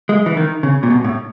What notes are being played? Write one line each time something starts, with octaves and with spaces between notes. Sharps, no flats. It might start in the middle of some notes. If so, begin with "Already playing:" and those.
G#3
E3
D#3
C#3
A#2
B2
A2